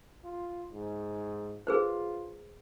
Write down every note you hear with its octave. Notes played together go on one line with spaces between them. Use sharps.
F4
G#2
F4 G#4 B4 C5